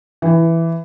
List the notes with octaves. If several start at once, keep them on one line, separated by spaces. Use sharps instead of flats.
E3